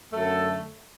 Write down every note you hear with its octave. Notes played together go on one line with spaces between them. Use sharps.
F#2 D3 A3 A4